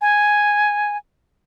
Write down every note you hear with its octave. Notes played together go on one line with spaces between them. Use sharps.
G#5